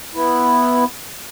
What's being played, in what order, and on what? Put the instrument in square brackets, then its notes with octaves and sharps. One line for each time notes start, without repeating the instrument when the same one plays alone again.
[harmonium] B3 E4